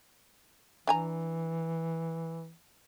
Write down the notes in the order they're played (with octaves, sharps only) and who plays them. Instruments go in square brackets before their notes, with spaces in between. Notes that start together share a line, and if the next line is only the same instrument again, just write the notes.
[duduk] E3 [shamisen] D4 G#5 A#5